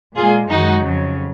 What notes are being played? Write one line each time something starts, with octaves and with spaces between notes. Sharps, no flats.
A#2 G#3 F4 G#4
F#2 D#3 G#3 D#4 F#4
F2 C#3 F#3